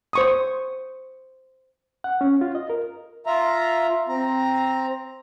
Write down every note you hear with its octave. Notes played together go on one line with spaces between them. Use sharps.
C5 C#6 D#6
F#5
C#4
F4
D#5
A#4
F4 E5 A#5
C4 A#5